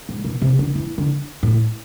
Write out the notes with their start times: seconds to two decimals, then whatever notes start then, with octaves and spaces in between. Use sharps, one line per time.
0.09 G#2
0.25 B2
0.42 C3
0.59 D3
0.75 E3
0.98 D3
1.43 A2